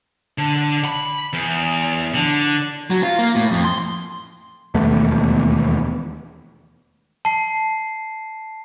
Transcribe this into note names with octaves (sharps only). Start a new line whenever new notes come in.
D3
B5
E2
D3
F#3
F4
A#3
A2
F2
C6
E1 D#2 A3 B3
A5 C7